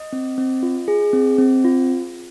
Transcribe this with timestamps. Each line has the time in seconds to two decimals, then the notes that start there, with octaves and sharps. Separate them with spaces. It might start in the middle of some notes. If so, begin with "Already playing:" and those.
Already playing: D#5
0.13 C4
0.38 C4
0.63 F4
0.88 G#4
1.13 C4
1.38 C4
1.65 F4